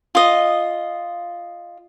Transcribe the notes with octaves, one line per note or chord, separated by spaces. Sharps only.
F4 D#5